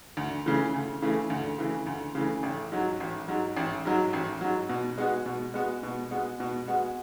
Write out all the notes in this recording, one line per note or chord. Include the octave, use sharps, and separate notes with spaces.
D2
C#3 E3 A3
D2
C#3 E3 A3
D2
C#3 E3 A3
D2
C#3 E3 A3
A1
G#2 F#3
A1
G#2 F#3
A1
G#2 F#3
A1
G#2 F#3
B2
G#3 B3 F#4
B2
G#3 B3 F#4
B2
G#3 B3 F#4
B2
G#3 B3 F#4